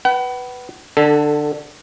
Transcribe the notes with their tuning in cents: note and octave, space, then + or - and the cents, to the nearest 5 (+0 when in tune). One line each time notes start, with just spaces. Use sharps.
B4 +0 F#5 +35
D3 +20 A4 +0